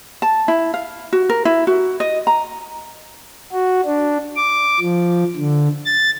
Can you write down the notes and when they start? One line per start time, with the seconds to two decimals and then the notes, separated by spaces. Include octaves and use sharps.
0.22 A5
0.48 E4
0.74 F5
1.13 F#4
1.29 A#4
1.45 E4
1.67 F#4
2.00 D#5
2.27 A#5
3.52 F#4
3.86 D4
4.36 D6
4.80 F3
5.36 D3
5.85 A6